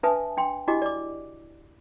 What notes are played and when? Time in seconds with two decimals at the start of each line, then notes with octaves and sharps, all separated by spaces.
0.03 D4 B4 E5 G#5 A5 D#6
0.37 D4 G5 C6
0.67 D4 E4 F#4 G4 D#5 D6
0.82 D5 D6